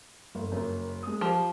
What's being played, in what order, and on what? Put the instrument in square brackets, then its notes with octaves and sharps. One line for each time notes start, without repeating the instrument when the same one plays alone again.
[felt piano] G1
F#1 F#2
G#3 D#6
[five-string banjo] F3 [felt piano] G4